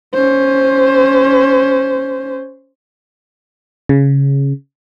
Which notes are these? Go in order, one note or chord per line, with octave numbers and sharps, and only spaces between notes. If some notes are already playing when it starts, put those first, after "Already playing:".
C#4 C5
C#3